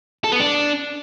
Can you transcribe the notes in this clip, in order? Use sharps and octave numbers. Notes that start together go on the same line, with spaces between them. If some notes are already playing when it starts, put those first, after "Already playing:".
A4
B3
D4